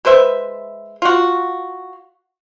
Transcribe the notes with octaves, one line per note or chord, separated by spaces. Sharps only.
G#3 B4 C5 E5
F4 F#4